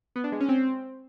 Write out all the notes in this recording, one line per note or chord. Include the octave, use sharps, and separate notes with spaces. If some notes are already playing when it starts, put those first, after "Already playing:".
B3
D4
G#3
C#4
C4